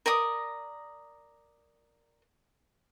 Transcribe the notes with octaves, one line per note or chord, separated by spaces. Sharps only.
A#4 D5 D#5 D#6